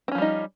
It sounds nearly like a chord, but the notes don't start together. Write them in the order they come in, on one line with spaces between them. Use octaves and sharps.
C4 C#4 F3 G3 D#4